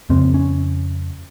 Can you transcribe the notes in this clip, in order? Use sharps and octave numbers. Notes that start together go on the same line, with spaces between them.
F2 C#3 C4
C#4